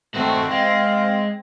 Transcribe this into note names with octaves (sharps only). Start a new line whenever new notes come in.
D#3 A3 C4 F#4
G#3 F5